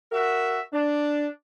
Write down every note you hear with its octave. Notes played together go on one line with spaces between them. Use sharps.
F#4 A#4 E5
D4